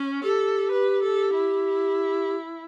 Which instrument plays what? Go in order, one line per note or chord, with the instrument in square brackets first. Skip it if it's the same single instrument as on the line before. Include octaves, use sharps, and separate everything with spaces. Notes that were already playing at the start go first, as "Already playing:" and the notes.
Already playing: [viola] C#4
[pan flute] G4 [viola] A4
[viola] B4
A4
E4